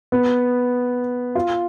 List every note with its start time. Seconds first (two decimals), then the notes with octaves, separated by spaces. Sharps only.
0.12 B3
1.35 F4